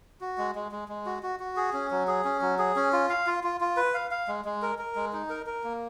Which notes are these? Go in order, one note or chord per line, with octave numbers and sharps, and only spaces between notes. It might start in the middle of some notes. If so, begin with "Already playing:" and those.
F#4
G#3
G#3
G#3
G#3
F#4
F#4
F#4
G#4
C#4
F#3
G#4
C#4
F#3
G#4
C#4
F4
F5
F4
F4
F4
B4
F5
F5
G#3
G#3
A#4
A#4
G#3
D#4
A#4
A#4
A#3